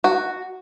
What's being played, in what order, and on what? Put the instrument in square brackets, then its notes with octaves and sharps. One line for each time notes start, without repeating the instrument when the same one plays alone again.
[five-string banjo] F#4